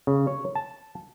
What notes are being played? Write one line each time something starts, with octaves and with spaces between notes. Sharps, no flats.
C#3
C#5
A5